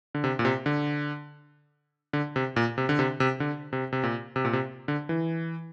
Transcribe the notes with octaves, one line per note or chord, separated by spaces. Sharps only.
D3
C3
A#2
C3
D3
D3
C3
A#2
C3
D3
C3
C3
D3
C3
C3
A#2
C3
A#2
C3
D3
E3